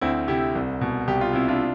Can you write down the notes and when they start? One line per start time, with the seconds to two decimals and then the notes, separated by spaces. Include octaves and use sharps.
0.01 D2 C4 E4
0.28 C3 E4 G4
0.55 C2
0.81 B2
1.08 C2 G4
1.21 F4
1.33 C3 E4
1.48 D4 F4